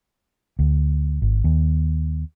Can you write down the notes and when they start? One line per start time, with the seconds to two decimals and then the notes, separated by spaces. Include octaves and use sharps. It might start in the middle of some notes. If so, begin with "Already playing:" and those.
0.59 D2
1.22 G#1
1.44 D#2